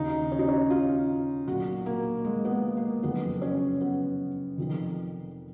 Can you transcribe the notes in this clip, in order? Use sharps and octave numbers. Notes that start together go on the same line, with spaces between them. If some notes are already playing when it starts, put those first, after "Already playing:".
Already playing: D#2 C#3 D#4
C#4
D#4
C#4
F4
B1 A#2 F#4
A#3
G#3
B3
A#3
A#3
F#1 F2 D#3 B3
C#4
B3
F1 F2 D#3